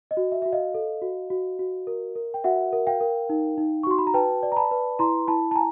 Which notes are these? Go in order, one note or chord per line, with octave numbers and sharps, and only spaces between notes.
D#5
F#4
E5
F#4 E5
D#5 F5
A4
F#4
F#4
F#4
A#4
A#4
G5
F#4 E5 F#5
A#4
F5 G5
A#4
D#4
D#4
C#6
F#4 C6
B5
A#5
B4 G5 A5
D5
A#5
A5 B5
B4
E4 A#5 C6
E4 A5 B5
A5
G#5 A#5